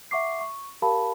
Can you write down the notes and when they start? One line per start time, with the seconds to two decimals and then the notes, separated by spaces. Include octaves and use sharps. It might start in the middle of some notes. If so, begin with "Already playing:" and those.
0.11 E5 F#5 C#6 D6 C7
0.41 C#6
0.82 G4 A#4 F5 A5 B5